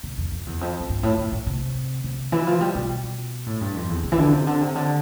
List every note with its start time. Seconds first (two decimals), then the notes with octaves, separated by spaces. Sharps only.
0.03 C3
0.18 F2
0.32 F2
0.46 E2
0.61 F2
0.80 F2
0.89 G2
1.03 A2
1.18 A2
1.32 A2
1.46 C3
2.04 C3
2.32 E3
2.47 F3
2.61 G3
2.75 B2
3.46 A2
3.61 G2
3.76 F2
3.89 E2
4.04 C3
4.12 E3
4.18 D3
4.32 C3
4.47 D3
4.61 C3
4.76 D3